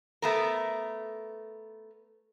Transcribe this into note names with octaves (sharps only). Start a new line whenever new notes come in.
A3 B3 A#4